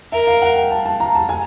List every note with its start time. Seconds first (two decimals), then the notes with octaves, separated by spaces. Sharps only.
0.12 A#4 E5
0.27 F5
0.42 F#5
0.56 G5
0.71 A5
0.86 A5
1.00 A#5
1.15 A5
1.29 G#5